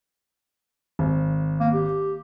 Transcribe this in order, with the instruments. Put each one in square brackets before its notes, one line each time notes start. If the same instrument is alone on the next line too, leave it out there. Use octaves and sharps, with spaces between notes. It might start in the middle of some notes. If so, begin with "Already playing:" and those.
[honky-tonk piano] G#1
[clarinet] A#3
G4